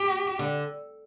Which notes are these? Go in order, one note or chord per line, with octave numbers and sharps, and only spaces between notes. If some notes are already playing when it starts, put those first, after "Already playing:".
Already playing: G4
D3